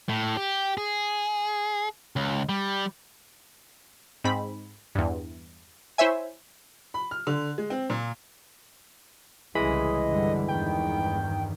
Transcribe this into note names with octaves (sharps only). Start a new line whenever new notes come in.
A2
G4
G#4
C#2
G3
G#2 C4 B5
E2 G2
E4 C5 C#5 E5 G#5
B5
F6
D3
G#3
C4
A#2
C2 C#3 E3 G#3 D#5 B5
G2 D3 G3
E2 G2 D#3 G5